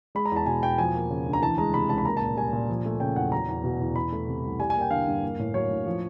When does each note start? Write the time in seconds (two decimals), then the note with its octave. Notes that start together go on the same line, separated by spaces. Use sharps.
0.15 G#3 B5
0.26 A#5
0.32 E2 A5
0.46 B2 G#5
0.62 E2 G5
0.78 F3 G#5
0.94 A#3
1.10 C#3
1.27 D2
1.33 A#5
1.42 E3 A5
1.58 G#3 A#5
1.74 C3 B5
1.89 C#2 A5
1.98 B5
2.05 A#3 A#5
2.17 A5
2.22 A#2
2.37 G3 G#5
2.53 A#2
2.69 F3
2.85 A3
3.00 C#3 G5
3.16 E2 F#5
3.32 F#3 A#5
3.49 E2
3.64 B2
3.80 E2
3.95 E3 B5
4.12 A3
4.28 C3
4.44 C2
4.59 G3 G#5
4.70 G#5
4.76 A#3
4.81 G5
4.91 D3 F5
5.07 G2
5.23 A#3
5.39 A2
5.54 F#3 C#5
5.71 A2
5.86 F3